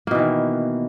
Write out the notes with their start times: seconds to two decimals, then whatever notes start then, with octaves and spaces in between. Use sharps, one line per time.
0.07 A#3
0.11 B2
0.15 E3
0.19 D#3